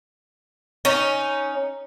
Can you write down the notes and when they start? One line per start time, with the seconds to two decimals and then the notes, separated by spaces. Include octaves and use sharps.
0.85 C#4 D#4